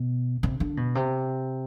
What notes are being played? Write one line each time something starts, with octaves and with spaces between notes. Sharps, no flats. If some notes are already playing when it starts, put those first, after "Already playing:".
Already playing: B2
C3
D3
B2
C3